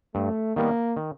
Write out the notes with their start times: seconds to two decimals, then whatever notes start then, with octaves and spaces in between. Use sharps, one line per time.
0.15 G2 A3
0.56 D#3 G3 A#3 B3
0.97 D#3